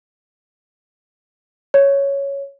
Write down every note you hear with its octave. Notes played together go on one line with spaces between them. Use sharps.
C#5